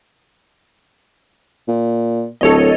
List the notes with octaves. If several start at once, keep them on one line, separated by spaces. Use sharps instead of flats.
A#2
D1 A4 C#5 D#5